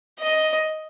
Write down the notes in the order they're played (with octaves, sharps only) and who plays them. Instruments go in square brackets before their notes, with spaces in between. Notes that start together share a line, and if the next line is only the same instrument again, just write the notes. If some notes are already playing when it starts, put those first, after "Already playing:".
[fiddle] D#5